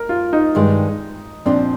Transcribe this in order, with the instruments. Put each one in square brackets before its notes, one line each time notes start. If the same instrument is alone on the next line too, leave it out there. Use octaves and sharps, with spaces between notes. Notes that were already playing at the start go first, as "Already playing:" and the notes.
Already playing: [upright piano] A#4
F4
D#4
[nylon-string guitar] G2 D#3 G#3
[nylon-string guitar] A#2 F3 C4 [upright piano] D4